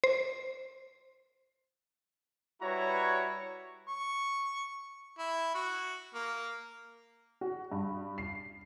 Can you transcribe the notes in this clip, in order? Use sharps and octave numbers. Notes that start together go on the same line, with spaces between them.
C5
G3 E4 F#4 B4 C#5 A#5
C#6
E4
F#4
A#3
F#4
G2
C7